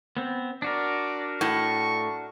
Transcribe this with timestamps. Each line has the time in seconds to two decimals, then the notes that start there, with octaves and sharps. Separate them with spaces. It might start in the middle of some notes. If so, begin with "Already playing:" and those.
0.17 B3 C4
0.62 D4 F#4 A#4 D5
1.41 A2 C#6